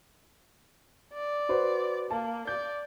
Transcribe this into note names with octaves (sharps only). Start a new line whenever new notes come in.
D5
F#4 B4 C5
A#3 A5
D5 G6